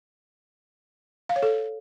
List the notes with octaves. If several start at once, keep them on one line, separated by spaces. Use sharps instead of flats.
F5
C#5
A4